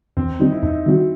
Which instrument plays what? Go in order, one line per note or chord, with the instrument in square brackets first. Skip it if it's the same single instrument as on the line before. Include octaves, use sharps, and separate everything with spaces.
[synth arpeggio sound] E2 [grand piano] C4
[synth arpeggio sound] D#3 G3 C4 [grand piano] D#4
[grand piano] E4
[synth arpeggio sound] E2 [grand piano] D#4
[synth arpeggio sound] D#3 G3 C4 F#4